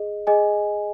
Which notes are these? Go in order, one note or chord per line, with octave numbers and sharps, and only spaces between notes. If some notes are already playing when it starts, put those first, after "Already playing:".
Already playing: G#4 D#5
G#4 D#5 G#5